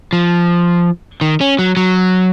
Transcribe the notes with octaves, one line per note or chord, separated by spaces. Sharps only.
F3
D#3
C#4
F#3
F#3